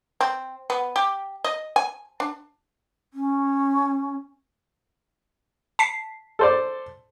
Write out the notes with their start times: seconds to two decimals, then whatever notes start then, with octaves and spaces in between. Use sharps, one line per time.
0.21 C4
0.70 B3
0.96 G4
1.44 D#5
1.76 G#5
2.20 D4
3.14 C#4
5.79 A5 B6 C7
6.39 A4 C5 D5